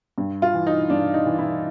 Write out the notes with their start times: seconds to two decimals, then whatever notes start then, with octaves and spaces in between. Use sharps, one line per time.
0.18 G2
0.42 F4
0.54 E3
0.67 D#4
0.90 G2 D4
1.14 D#4
1.26 E3
1.38 E4